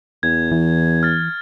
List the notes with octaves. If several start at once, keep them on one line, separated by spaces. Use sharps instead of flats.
E2 G#6
E3
F6 A6